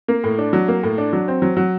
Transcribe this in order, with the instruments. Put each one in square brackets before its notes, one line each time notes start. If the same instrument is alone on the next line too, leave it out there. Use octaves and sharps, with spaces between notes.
[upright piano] A#3
A2
D4
F#3
A#3
A2
D4
F#3
C4
F#3
F#3